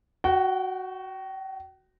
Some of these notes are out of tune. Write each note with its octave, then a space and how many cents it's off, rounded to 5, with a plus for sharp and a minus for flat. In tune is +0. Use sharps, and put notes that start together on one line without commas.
F#4 +5 G5 -35